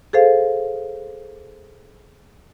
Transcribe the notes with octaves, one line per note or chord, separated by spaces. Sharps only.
G#4 A4 C5 F5